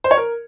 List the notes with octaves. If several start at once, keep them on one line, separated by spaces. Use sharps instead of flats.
C5
C#5
A#4